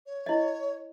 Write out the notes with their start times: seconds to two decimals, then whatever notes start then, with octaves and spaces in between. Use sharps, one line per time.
0.06 C#5
0.26 E4 D#5